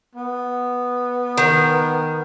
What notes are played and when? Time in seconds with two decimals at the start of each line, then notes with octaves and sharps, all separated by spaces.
0.15 B3
1.38 D#3 A#4